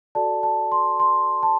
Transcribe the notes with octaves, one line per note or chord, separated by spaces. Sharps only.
F#4 A4 D5 A5
A5
C6
C6
A5